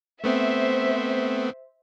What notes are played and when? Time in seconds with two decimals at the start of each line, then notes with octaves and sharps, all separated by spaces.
0.24 A3 B3 C4 C5 E5